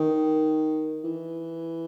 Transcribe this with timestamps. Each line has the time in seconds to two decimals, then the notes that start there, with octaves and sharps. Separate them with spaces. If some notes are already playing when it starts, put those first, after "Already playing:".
Already playing: D#3
1.04 E3